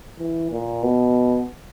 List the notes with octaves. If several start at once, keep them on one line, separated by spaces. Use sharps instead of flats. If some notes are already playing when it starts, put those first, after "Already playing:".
E3
A#2
B2